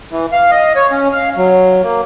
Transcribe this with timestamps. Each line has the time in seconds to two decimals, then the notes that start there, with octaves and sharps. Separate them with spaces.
0.12 E3
0.32 F5
0.51 D#5
0.76 C#5
0.91 C#4
1.12 F5
1.37 F#3
1.83 A#3